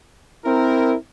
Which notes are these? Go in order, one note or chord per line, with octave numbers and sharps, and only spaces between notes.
C4 E4 A#4